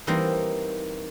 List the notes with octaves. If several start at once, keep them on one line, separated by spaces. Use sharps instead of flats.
E3 G3 A#3 C4 D#4